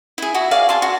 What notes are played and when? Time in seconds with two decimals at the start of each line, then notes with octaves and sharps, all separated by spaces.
0.18 E4 G#4
0.34 E4 F#4 E5
0.51 G#4 D5 F5
0.69 G#4 A5 C6
0.82 F#4